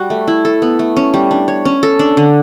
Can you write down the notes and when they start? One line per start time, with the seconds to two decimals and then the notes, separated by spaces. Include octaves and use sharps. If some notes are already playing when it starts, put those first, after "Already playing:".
Already playing: G3 F#4
0.10 A3
0.28 E4
0.45 A4
0.62 B3
0.79 A3
0.97 C#4
1.14 G3
1.31 D4
1.48 C#5
1.65 C#4
1.83 A4
1.99 D4
2.17 D3